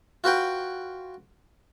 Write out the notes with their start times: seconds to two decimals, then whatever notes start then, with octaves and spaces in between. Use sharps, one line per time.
0.24 F4 F#4 B4 G5